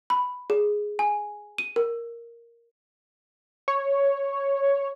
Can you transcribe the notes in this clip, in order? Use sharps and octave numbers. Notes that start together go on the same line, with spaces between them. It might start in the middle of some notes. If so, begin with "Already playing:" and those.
B5
G#4
G#5
D#7
A#4
C#5